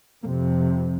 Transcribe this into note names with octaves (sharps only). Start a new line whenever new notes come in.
F2 C3 A#3